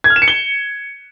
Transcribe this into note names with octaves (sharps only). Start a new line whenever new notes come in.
G#6
F6
E7
C#7
G7